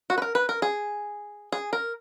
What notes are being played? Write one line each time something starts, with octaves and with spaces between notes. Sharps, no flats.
F#4
B4
A#4
B4
A#4
G#4
G#4
A#4